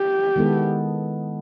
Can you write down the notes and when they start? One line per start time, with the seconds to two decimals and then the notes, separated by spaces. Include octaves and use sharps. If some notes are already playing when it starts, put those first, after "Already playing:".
Already playing: G4
0.36 D#3 G#3 B3 E4 A4